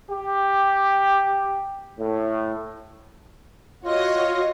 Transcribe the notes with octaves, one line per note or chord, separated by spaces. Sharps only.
G4
A2
F4 F#4 C#5 D#5